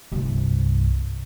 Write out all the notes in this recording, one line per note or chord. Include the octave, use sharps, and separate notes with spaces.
C2 G2